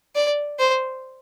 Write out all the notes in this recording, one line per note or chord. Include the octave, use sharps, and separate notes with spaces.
D5
C5